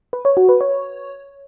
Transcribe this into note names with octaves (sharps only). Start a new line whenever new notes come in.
B4
C#5
F#4
B4
C#5